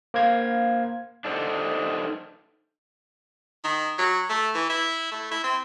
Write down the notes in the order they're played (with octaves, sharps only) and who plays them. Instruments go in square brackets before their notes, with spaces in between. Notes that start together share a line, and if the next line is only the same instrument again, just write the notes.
[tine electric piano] A#3 C5 F5 G#6
[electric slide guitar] D4 D#4 A4 C5
[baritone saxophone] D#3
F#3
A3
E3
E4
A3
E4
C4